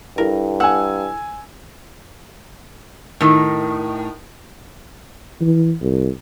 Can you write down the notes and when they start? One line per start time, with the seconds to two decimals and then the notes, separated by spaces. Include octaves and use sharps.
0.18 G2 E4 A4 A#4
0.60 F#5 G#5 E6
3.21 A2 D#3
5.41 E3
5.82 C2